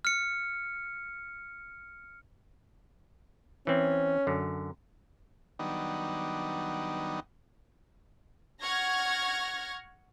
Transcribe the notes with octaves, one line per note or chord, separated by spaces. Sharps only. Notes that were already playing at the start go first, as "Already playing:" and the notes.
F6 C#7
E3 C4 C#4
F#2 D3
D#3 F#3 G3 B3 D4 D#4
F#5 C#6 F6 G#6 A#6